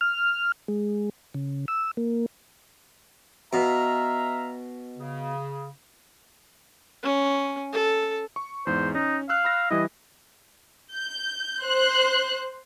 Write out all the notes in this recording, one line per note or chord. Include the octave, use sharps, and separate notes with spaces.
F6
G#3
C#3
E6
A#3
B2 E5 F5 A#5
C#3
C#4
A4
C#6
E2 G#2 C5
C#4 D#4
F5 E6 F#6
B5 E6 A#6
E3 G3 E4 D#5
G6
C5 F#6